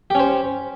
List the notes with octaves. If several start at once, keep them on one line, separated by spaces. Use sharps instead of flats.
C#4 G4 C5